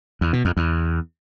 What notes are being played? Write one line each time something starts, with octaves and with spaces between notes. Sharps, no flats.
E2
B2
F2
E2